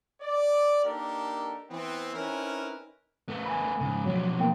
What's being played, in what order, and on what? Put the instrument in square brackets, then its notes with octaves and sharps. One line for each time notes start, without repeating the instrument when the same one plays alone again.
[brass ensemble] D5
A#3 D4 D#4 G4 A4 A#4
E3 B3 C4
C4 C#4 D#4 E4 A#4 B4
[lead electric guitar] A3 B3
[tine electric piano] G#5 B5
[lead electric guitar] G#2 C#3
[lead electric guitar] B2 F3 [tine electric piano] F#3
[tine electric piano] A#3 B3 G5